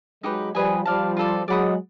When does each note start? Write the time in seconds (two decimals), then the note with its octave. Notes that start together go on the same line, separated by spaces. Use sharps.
0.23 F#3 G#3 D#4 G4 B4
0.54 F3 G3 G#4 B4 D#5 G#5
0.85 F3 G3 D5 F5 A5
1.17 F4 A4 D5
1.48 F#3 G#3 D5 F#5 B5 D#6